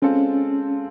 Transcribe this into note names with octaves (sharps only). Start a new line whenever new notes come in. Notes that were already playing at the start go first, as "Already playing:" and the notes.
G#3 C4 C#4 F4 A4